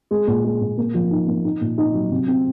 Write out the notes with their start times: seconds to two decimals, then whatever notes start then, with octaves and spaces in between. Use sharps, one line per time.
0.11 G#3
0.27 A#2
0.44 G#3
0.61 A#2
0.77 A#3
0.94 F3
1.11 D#4
1.27 A#3
1.44 D#4
1.61 A#2
1.78 D#4
1.94 F#3
2.11 C3
2.28 C4